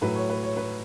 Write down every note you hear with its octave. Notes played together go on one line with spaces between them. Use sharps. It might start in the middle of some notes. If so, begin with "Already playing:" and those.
A2 F#3 B4
C#5
B4
C#5
B4